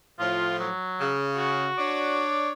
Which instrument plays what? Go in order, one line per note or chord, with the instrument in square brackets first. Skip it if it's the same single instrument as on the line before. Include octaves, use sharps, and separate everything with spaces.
[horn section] A2 F3 [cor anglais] F4
[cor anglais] F#3
[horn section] C#3
[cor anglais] F#4
[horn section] D4 C#5 D5